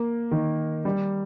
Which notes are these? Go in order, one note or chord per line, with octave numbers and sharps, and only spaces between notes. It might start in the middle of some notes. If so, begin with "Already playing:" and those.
Already playing: A#3
D#3
G3